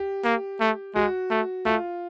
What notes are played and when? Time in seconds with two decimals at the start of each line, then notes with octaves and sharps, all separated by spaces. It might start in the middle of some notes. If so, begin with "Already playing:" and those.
Already playing: G4
0.25 A#3
0.61 A3
0.95 G#3 F#4
1.31 A3
1.65 A3 F4